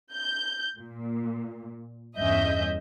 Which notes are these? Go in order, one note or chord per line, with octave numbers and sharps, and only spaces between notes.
G6
A#2
E2 G2 C#4 D#5 E5 G6